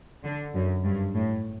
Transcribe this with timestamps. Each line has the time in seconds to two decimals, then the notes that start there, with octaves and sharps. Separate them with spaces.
0.24 D3
0.54 F#2
0.84 G2
1.15 A2